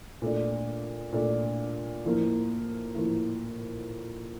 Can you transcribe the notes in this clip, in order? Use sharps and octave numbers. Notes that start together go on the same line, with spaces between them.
A#2 A3 D4
A#2 A3 D4
A2 F3 A#3
A2 F3 A#3